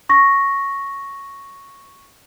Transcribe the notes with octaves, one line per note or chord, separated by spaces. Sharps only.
C#6 A#6